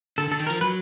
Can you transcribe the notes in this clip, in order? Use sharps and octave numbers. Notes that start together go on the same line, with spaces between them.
D3 A4
D3 A4
D#3
A#4
F3
F#3 B4